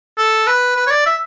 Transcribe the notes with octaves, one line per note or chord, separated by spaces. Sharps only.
A4
B4
B4
C#5
D5
E5